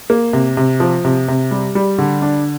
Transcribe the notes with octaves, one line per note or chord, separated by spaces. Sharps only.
A#3
C3
C3
F3
C3
C3
G3
G3
D3
D4